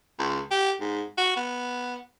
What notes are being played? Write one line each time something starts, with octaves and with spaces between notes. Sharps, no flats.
C#2
G4
G#2
F#4
B3